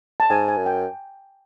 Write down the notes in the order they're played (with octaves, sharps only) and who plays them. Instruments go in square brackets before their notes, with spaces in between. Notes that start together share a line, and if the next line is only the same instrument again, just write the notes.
[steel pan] A5
[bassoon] G#2 [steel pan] G#5
[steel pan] G#5
[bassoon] F#2
[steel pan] G5